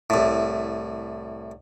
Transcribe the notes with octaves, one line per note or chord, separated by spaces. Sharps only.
C2 A2